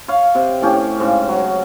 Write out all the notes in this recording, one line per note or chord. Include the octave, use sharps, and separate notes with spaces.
C#5 F5
C3
A2 C#4 G4
G#2 C#3
F#3